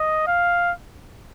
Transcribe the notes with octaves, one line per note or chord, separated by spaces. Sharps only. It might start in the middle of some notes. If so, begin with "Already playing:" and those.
Already playing: D#5
F5